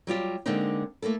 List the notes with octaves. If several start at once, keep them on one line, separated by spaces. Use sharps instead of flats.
F#3 G3 F4 G4
D3 G#3 A#3 C4 D4 D#4
A3 A#3 E4 A4